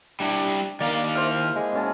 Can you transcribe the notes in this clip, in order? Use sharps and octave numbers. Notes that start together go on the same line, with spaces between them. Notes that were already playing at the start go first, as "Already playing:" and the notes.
G3 D4 E4 G4
D#3 A#3 D5 F5
E4 C5 F6
G#3
B2 C#4 A5